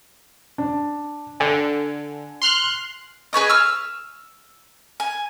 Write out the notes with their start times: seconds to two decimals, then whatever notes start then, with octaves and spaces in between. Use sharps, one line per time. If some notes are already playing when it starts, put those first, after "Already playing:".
0.58 D4
1.40 D3 G#5
2.42 C6 F6 F#6
3.33 G#4 B4 C#5 D#5
3.50 E6 F6
5.00 G#5